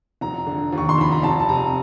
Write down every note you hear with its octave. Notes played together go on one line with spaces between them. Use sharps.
F1 A#5
D3
D#2
C#6
C6
F1 B5
A#5
F1 A5
A5
C3 A#5